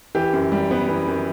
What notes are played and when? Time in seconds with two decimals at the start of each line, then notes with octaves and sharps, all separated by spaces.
0.15 E3 G4
0.33 F#2
0.52 G3
0.71 B3
0.89 E3
1.07 F#2